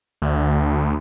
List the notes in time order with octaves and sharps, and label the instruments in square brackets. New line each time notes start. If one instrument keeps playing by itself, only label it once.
[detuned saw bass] D2